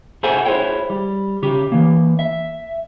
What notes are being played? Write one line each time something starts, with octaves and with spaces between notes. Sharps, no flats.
G#4 A4 C5 E5 F#5 G#5
E4 G#4 C5 C#5 G5
G3
C#3 G4
E3 A#3
E5